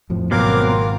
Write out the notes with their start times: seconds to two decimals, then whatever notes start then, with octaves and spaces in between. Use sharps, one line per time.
0.10 F2 A2 F3
0.31 G#1 B2 F#3 A#3 C4 A#4 F5 D6
0.67 F4 A#4